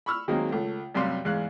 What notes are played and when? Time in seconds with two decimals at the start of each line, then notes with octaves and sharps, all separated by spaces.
0.06 B5 C#6 E6 F6
0.28 D#3 F#3 G#3 A#3 C4
0.52 C#2 A3
0.95 F#2 C3 G3 D5 F5 C6
1.25 E2 G#2 F5 F#6